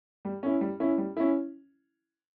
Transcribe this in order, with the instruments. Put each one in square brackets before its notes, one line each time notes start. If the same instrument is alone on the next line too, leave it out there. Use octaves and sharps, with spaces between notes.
[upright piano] G3
C#4 E4
G3
C#4 E4
G3
C#4 E4